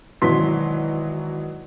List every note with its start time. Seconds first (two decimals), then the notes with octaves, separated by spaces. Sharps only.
0.22 G#1 B2 E3 F#3 C6 B6